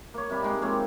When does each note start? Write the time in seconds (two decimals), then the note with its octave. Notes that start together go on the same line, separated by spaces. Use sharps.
0.14 A#3 C#5
0.30 C3 G3
0.42 G#3 D#4
0.62 F3 A#3 C4 C#5